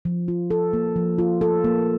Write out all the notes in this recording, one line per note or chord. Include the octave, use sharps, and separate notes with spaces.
F3
F4
A4
A#3
F3
F4
A4
A#3